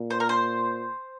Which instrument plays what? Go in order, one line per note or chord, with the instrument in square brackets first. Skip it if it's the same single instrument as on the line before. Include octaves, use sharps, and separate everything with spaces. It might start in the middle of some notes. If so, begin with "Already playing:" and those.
Already playing: [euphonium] A#2
[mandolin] C5
A#4
C5